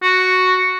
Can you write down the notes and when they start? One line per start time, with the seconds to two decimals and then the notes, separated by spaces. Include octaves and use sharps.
0.02 F#4